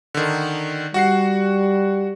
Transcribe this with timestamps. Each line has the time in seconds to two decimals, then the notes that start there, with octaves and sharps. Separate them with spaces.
0.14 D3 D#3
0.94 G3 F#4 F#5 C7